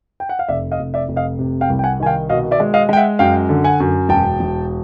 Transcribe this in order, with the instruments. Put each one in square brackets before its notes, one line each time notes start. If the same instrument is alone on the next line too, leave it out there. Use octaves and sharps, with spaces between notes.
[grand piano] G5
F#5
F5
F1 D5 E5
D#5 F5
F1
D5 E5
F1
D#5 F5
C3
F5 G5
C2
G5
F#5 G#5
D#3 G#5
F5 G5
B2 D#5 F5
D5 E5
G#3
D#5 F5
G#3 G5
E5 F#5
F#2 F5 G5
D3
F#5 G#5
F#2
E1 G5 A5
E1